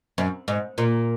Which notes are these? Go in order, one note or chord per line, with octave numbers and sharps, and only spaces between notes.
F#2
G#2
A#2